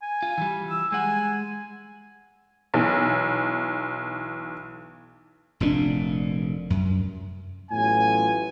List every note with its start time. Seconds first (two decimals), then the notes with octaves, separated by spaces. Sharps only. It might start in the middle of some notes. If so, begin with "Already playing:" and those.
0.02 G#5
0.22 F4
0.38 E3 G3
0.70 E6
0.92 G#3 F#5 G#5
2.74 B1 E3
5.60 F1 A#2 C#4 D4
6.70 F#2
7.72 A1 A2 F#3 B3 F4 G#5